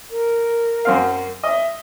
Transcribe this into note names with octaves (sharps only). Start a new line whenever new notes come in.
A#4
F#2 C4 F5
D#5 E5